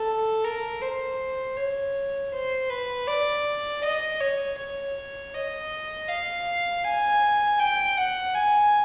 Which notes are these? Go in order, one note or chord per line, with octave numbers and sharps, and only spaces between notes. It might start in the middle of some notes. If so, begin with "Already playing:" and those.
Already playing: A4
A#4
C5
C#5
C5
B4
D5
D#5
C#5
C#5
D#5
F5
G#5
G5
F#5
G#5